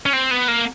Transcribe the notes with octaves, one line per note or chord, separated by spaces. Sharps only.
C#4
C4
B3
A#3